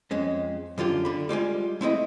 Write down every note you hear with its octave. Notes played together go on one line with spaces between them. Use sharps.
F2 G#3 C#4
F#2 D3 F4 G4
D3 B5
G3 G#3 F4 G#5
A3 C4 E4 D#5